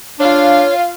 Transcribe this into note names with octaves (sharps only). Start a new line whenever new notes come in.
D4 F4 C#5 F5